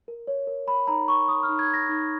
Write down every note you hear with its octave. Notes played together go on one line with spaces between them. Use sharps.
A#4
C#5
A#4
C#5 B5
D#4 A#5
A#4 C#6
A#4 D#6
F6
D#4
G#6
D#4
A#6
D#4